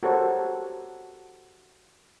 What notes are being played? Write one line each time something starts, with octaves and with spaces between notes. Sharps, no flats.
F#4 G4 A4 A#4 C5 C#5